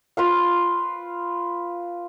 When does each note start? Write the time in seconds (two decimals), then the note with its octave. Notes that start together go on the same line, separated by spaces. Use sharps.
0.17 F4 B4 F5